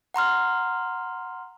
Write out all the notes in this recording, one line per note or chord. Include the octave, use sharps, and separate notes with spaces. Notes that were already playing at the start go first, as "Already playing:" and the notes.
F#5 A#5 C6 F6